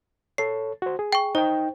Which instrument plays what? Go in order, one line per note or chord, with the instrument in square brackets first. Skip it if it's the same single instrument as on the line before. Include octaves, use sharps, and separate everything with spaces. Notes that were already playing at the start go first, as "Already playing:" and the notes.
[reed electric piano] A4 C#5 [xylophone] C7
[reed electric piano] F#4 C5
G#4
[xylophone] G5 C#6
[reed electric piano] D#4 G5 [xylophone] C5